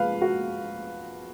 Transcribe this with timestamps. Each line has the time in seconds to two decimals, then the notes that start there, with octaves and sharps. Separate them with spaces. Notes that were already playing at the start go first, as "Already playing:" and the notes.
Already playing: F3 G#3 B4 F5
0.22 F#4